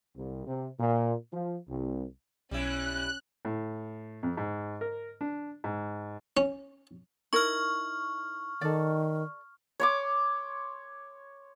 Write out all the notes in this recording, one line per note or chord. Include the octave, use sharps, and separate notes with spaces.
C2
C3
A#2
F3
C2
B1 G3 C#4 E4 F#6
A2
F2
G#2
A#4
D4
G#2
C#4
D#4 E4 A#4 C#6 F6
D#3 A4 D5
C#5 C6 D6